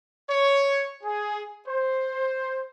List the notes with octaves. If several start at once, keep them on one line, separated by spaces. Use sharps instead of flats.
C#5
G#4
C5